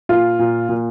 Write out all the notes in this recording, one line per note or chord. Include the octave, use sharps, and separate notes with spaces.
A#2 F4
A#2
A#2